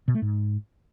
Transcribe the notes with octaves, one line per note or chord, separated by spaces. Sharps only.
B2
A3
G#2